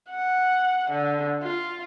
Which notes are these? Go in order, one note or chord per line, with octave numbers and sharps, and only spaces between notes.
F#5
D3
F4